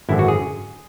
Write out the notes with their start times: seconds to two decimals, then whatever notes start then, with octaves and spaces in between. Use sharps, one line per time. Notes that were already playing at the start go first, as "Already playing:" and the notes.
0.09 G#1 F#2 D3 E4
0.19 F#4
0.28 G#4